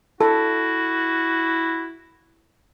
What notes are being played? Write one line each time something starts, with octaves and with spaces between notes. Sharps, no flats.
E4 F#4 A4